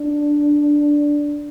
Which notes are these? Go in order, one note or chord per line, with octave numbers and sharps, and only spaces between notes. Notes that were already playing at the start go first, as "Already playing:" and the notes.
Already playing: D4